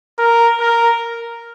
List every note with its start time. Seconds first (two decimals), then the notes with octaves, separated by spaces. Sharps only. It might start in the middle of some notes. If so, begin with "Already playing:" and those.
0.18 A#4
0.60 A#4